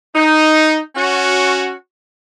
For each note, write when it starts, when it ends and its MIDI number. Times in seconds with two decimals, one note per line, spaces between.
0.15 0.79 63
0.96 1.71 61
0.96 1.71 66